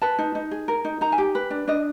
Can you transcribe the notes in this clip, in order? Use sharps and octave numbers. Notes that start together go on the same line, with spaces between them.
B4 A5
D#4
D#4
G#4
A#4
D#4
D#4 A#5
G#5
G4
B4
D4
D4 D#5